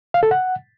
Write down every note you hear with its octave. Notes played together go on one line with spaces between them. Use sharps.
F5
A4
F#5